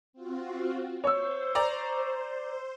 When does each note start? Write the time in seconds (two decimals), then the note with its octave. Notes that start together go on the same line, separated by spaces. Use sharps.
0.13 C4 F4 F#4
1.04 C5 C#5 C#6 E6
1.55 D5 A#5